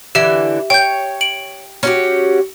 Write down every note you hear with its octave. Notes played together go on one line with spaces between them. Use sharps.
D3 E3 G4 E5
C#5 G5 G6
D7 F#7
C#4 F#4 G4